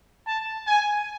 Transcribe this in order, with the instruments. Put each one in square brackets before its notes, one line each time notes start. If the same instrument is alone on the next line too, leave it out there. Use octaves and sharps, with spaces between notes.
[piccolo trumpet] A5
G#5